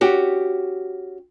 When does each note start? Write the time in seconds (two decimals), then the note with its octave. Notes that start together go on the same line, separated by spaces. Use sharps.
0.01 C#4 F#4 G4